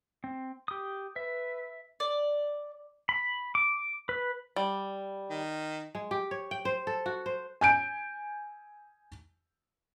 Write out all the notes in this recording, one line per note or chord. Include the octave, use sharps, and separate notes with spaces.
C4
G4 D#6
B4 E5
D5
B5
D6
B4
G3
D#3
G#3
G4
C#5
G5
C5
A4
F#4
C5
G#5 G6 D7